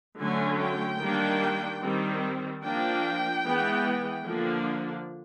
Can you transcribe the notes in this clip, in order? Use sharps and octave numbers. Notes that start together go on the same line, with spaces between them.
D3 F#3 A3 C#4 G#5
G5
D#3 G3 A#3 D4
D#3 G3 C4
F3 A#3 D4 G5
E3 G#3 B3
D3 F3 A#3 D4